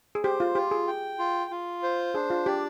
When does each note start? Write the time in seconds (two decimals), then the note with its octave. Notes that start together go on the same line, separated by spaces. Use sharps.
0.15 G#4
0.23 G4 C5
0.40 F4
0.55 F4 G4
0.71 G#4
0.87 G5
1.19 F4
1.51 F4
1.83 C5
2.14 D4 G#4
2.30 F4
2.46 G4 D5